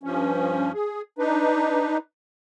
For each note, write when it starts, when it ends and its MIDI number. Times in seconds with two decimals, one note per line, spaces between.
0.03 0.72 43
0.03 0.72 53
0.03 0.72 61
0.74 1.02 68
1.18 1.97 62
1.18 1.97 63
1.18 1.97 71